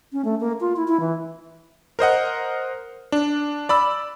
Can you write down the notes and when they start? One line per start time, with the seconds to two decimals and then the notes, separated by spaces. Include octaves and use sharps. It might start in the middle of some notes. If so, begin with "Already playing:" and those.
0.13 C#4
0.25 A3
0.41 A#3
0.61 F4
0.76 E4
0.88 E4
1.00 E3
1.99 A#4 C5 D#5 F#5
3.12 D4
3.69 D5 B5 E6